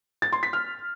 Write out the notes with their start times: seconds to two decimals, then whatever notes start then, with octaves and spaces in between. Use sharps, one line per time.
0.22 A6
0.32 C6
0.43 B6
0.53 F6